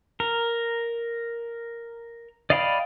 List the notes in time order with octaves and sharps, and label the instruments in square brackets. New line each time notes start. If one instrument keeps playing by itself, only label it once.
[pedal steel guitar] A#4
D5 D#5 F5 G5 B5